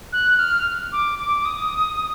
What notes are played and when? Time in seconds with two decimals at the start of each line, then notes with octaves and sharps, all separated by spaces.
0.13 F#6
0.39 F6
0.92 D6
1.19 D6
1.45 D#6